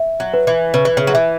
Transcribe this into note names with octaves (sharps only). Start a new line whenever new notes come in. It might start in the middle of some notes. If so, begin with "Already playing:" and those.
Already playing: E5
F#3
B4
E3
C#3 B4
E3
C#3
F#3
E3 E5